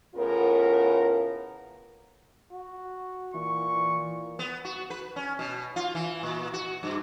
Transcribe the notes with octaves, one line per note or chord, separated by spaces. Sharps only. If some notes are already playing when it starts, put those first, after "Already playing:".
A2 C#3 B3 F4 A#4
F#4
A#2 E3 C#6
B3
F#4
B4
C#4
B2
F4
E3
A#2
F#4
G2